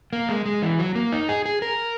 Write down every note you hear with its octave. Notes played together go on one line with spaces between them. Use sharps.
A#3
G#3
G#3
E3
F#3
A#3
D#4
G#4
G#4
A#4